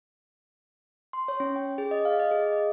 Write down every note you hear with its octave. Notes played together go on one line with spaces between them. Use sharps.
C6
C#5
C#4
G5
G#4
D#5
F5
D#5
G#4
D#5